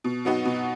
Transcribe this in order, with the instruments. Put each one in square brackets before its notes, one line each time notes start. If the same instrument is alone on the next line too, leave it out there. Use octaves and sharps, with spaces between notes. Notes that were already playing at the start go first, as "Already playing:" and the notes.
[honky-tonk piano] B2
F#3 B3 D#4 F#4
B2